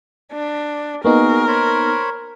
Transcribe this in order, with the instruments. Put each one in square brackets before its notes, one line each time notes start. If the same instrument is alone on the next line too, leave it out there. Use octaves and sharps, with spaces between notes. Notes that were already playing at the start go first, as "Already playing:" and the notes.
[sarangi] D4
[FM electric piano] A#3 B3 D#4 [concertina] F#4 G#4 [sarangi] A#4
[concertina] C5 C#5 B5